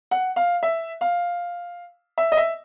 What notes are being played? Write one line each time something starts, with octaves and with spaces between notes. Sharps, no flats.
F#5
F5
E5
F5
E5
D#5
E5